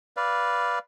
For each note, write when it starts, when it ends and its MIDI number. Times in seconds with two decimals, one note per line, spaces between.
0.17 0.79 71
0.17 0.79 74
0.17 0.79 77